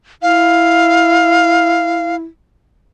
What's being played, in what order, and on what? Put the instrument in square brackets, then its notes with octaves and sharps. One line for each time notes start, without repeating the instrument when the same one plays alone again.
[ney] E4 [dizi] F5